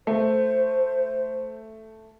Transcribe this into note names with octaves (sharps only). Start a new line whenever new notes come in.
A3 C5